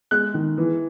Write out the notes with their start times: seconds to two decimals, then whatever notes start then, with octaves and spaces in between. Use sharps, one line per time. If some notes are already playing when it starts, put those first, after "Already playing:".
0.11 G#3 F#6
0.34 D#3
0.58 E3